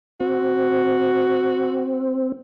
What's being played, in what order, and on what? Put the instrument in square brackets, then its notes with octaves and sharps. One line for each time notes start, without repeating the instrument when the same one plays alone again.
[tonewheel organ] C4 [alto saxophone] F#4